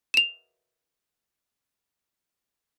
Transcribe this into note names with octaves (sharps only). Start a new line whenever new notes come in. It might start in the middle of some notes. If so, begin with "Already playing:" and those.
E7 F7